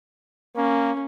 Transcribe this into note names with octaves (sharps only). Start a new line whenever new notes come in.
A#3 C#4